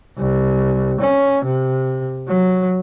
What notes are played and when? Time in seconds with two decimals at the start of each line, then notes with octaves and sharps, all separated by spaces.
0.18 C2
1.01 C#4
1.45 C3
2.28 F#3